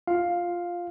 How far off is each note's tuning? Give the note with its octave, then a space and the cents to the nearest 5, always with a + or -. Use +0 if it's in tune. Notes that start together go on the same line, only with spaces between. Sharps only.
F4 +0 F5 +5